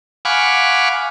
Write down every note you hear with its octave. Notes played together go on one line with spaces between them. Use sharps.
F5 F#5 G#5 B5 C#6 D6